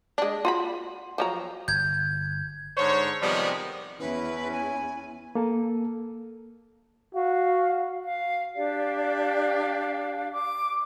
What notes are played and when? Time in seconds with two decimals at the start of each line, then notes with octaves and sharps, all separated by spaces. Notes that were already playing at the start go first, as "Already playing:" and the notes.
0.18 G#3 D4
0.45 F4 F#4 B5
1.18 F3 F#3 A#5
1.68 G1 G6 G#6
2.77 G#2 D3 C5 C#5
3.21 C3 D#3 F3 G3 G#3 B3
4.00 E2 C#4 E4 B4
4.52 G#5
5.35 A#3 A4
7.15 F#4 F5
8.03 F5
8.55 D4 G4 D5 F5
10.31 D6